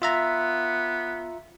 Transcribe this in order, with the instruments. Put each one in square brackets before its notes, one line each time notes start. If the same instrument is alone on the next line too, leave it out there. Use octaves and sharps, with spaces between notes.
[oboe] B3 [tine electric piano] F4 E5 A#5